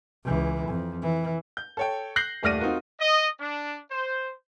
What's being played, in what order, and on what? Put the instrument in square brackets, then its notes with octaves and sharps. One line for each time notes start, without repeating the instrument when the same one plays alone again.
[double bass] C#2 E3
F2
E3
[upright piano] G6
A4 C#5 G5
F#6 G6 A#6 C7 F#7
D#1 A3 D5 F6 A#6 D#7
C4 D#4 F4 F#4 A#4
[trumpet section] D#5
D4
C5